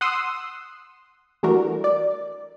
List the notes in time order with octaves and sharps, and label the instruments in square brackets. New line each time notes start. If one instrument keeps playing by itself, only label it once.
[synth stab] F#5 C6 D#6 E6
E3 G3 A3 D4 F#4 A#4
D5